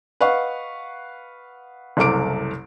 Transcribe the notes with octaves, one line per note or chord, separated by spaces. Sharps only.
B4 D#5 F5 F#5 C#6
F#1 C2 A4 D6 D7